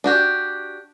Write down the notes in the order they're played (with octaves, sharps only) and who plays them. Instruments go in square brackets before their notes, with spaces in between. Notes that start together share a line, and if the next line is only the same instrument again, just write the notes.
[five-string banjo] D4 F#4 G4